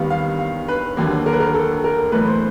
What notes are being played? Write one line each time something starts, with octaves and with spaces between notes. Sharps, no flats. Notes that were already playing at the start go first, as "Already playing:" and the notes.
Already playing: D#2 D#3 G3 B3 F5
F5
F5
B4
D#2 D3 F#3 A#3
A#4
B4
A#4
A4
A#4
B1 A2 E3 A3 B4
C5